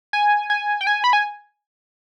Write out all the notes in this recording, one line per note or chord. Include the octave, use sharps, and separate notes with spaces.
G#5
G#5
G5
G#5
B5
G#5